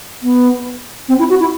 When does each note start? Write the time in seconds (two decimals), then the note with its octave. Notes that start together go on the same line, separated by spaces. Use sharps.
0.23 B3
1.09 C4
1.19 E4
1.30 F#4
1.40 E4